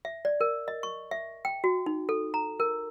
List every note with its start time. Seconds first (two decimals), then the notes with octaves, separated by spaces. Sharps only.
0.05 E5
0.25 D5
0.41 A#4
0.68 D#5
0.83 C#6
1.11 E5
1.45 G5
1.64 F#4
1.86 D#4
2.09 A4
2.34 A#5
2.60 A#4